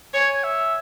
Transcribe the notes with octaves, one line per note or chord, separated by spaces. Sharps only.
C#5 G#5
E5